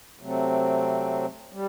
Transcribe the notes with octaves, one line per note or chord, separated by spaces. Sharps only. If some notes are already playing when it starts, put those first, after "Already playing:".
C3 F#3 A3 C4
G3